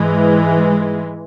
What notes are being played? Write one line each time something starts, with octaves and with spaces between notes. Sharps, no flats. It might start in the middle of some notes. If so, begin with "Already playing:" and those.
Already playing: G#2 E3 G#3